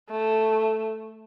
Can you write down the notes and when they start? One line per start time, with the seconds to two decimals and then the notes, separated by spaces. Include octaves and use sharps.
0.11 A3